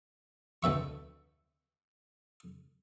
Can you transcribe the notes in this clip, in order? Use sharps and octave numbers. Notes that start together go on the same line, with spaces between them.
D2 B2 E5 C#6